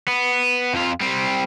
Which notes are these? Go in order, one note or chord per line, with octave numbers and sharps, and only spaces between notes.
B3
F2 F4
G3 C4